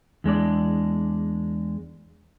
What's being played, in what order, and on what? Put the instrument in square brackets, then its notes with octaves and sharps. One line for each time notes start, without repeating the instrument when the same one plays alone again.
[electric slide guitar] E2 G#3 D4 D5